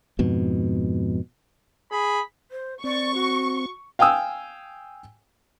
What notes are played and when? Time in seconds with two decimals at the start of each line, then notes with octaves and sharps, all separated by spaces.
0.19 F2 G#2 B2
1.91 G#4 B5
2.51 C5
2.84 C4 D5 C#6
3.14 F#4
3.99 F5 G5 G#5 D#6 E6